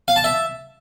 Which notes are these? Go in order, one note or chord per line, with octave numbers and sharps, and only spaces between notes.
F5
A5
E5